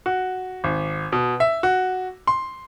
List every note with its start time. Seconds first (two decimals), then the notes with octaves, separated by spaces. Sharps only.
0.06 F#4
0.64 G#1
1.12 B2
1.40 E5
1.63 F#4
2.27 C6